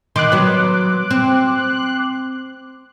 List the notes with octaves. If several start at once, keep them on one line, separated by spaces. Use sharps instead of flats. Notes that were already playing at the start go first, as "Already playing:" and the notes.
D#3 C6 D6 F#6
F#3 B3
C4